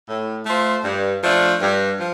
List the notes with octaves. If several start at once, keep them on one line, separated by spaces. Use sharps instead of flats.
A2
A3 F4 C5
G2
F3 A3 D4
G2
F3